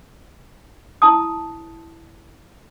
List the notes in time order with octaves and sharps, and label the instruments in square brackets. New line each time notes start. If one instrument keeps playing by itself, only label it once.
[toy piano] E4 A5 D#6